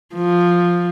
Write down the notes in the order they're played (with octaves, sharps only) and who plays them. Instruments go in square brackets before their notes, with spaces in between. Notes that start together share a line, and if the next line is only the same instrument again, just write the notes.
[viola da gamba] F3